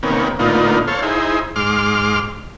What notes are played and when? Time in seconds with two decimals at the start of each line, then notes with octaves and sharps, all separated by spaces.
0.03 C3 D#3 A#3 B3 C#4
0.39 A2 D3 A#3 B3 D#4 F4
0.87 A4 C5 C#5 F5
1.02 D#4 E4 G#4 C5
1.56 G#2 C6 D6 F6